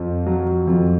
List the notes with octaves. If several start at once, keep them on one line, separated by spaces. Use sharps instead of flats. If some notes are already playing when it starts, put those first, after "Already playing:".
Already playing: F2 F3
F#3
F2